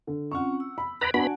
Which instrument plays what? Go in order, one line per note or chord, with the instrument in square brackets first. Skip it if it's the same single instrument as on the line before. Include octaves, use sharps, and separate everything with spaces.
[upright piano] D3
[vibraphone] C4 C#4 F4 [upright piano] F#5 C#6
[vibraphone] E6
[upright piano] B5
[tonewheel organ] B4 A#5 B5 [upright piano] F#6 G#6 D7
[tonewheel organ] B3 B5 [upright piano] D4 F#4 [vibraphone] F#5 G#5 A5